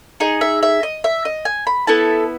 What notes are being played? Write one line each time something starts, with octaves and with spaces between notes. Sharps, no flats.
D#4 G#4 D#5
E5
E5
D#5
E5
D#5
G#5
B5
B3 E4 A4 A5